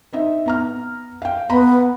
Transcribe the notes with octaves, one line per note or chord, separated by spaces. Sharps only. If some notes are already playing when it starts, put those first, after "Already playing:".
C4 D#4 E5
B3 A#5 F6
F5 G5
B3 A#5 B5